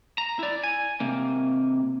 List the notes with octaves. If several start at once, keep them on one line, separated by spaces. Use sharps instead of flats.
A#5
E4 D5
G#5
C3 A#3